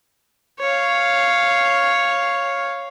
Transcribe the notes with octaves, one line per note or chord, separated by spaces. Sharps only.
C#5 F5